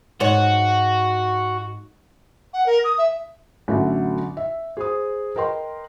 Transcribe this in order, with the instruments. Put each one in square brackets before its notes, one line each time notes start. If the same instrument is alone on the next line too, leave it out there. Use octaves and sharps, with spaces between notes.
[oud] G#2 C#5 [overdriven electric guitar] F#4
[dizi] F#5
A#4
D#6
E5
[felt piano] A1 D3 F#3 E5
E5
G#4 C5 D#6
A#4 B4 D#5 G5 A#5 C6